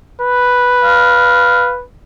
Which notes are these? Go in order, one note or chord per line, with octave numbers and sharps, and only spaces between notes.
B4
F5